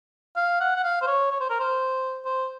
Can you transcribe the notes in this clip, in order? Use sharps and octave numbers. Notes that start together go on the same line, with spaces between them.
F5
F#5
F#5
F5
C5
C#5
C#5
C5
A#4
C5
C5